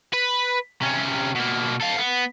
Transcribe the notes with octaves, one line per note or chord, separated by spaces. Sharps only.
B4
C3 C#4
B2 A#3
A4 F5
B3